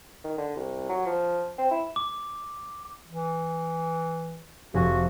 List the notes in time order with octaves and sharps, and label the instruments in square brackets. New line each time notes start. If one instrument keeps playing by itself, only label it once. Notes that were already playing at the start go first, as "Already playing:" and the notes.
[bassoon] D#3
D3
C2
F#3
F3
C4
E4
[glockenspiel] D6
[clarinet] E3
[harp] F1 G#5 [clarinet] F#4